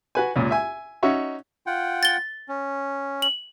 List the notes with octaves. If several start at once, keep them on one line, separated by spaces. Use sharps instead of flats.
F#4 B4 G#5
C#2 A#2
E5 G#5
C#4 D#4 F#4 C#5 E5
F4 F#5 G5
A6 G7
C#4
F#7